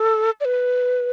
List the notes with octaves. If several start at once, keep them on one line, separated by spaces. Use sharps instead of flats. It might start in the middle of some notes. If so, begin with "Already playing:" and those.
Already playing: A4
D5
B4